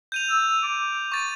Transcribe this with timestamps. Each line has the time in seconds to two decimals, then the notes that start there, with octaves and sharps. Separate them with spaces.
0.12 G6 D#7 F7
0.29 E6
0.63 D6
1.12 C#6 A6 D#7